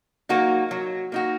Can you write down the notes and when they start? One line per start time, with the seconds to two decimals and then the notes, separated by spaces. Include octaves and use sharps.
0.29 F#3 A#3 D#4 F#4
0.71 F#3
1.12 A#3 D#4 F#4